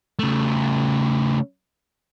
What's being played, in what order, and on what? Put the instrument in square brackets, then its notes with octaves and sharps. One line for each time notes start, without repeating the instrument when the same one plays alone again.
[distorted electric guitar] C#3 A3